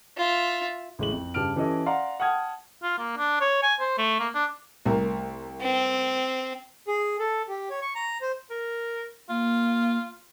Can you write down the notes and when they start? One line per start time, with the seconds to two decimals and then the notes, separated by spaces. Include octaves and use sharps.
0.17 F4 E5
0.99 A1 G#3 F#7
1.12 F2
1.34 G2 C#3 G4 A5 F6 D7
1.56 E3 C#4 G4 A4 D#5
1.86 D5 F5 F#5 A#5 C6
2.20 F#5 G5 A5 D#6 F6 G#6
2.83 F4
2.98 A#3
3.18 D4
3.41 C#5
3.63 G#5
3.80 C5
3.98 A3
4.19 A#3
4.34 D4
4.85 C2 A2 A#4
5.61 C4
6.88 G#4
7.20 A4
7.48 G4
7.70 C#5
7.82 C#6
7.95 A#5
8.21 C5
8.50 A#4
9.29 A#3 F4